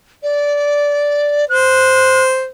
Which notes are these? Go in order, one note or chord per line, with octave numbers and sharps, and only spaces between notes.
D5
C5 F#6